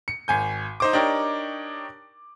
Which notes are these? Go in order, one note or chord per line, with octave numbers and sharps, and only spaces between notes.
C#7
G#1 G#5 G6
D#4 C5 D6
D4 D#4 G4 A#4 C#5